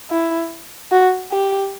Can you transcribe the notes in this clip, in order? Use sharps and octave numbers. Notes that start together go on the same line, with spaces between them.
E4
F#4
G4